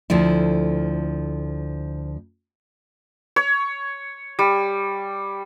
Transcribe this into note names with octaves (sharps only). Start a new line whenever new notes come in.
D2 F3 A3 E4
C#5
G3